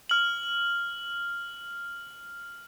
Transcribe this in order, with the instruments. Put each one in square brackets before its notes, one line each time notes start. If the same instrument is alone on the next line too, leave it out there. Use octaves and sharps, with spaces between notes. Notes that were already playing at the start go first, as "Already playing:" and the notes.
[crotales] F6 F#7